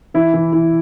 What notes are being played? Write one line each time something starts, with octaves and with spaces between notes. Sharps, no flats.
E3 E4
E3
E3